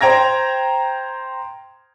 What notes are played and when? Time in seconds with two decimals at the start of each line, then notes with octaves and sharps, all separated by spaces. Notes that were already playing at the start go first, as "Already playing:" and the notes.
0.01 C5 G5 A#5 G#6 A#6